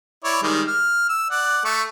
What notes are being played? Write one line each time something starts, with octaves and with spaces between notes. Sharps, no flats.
E4 C#5 D5
D#3 G3 G#3
F6
E6
D5 F#5
A3 C#6